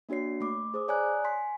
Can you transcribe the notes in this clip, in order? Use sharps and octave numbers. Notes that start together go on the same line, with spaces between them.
A#3 D4 F#4 C#5 C7
A3 D6
G#4 C5 D6 D#6
C#5 D5 G#5 A#5 D#6 F#6
G#5 C6 B6